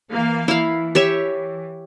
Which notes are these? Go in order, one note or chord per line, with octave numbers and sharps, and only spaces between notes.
E3 A#3 F5
E3 E4 F5
G4 C#5 E5